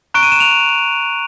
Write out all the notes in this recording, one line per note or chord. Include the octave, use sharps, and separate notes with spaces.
A#5 C#6 F#6 D7
D#7
E7
F7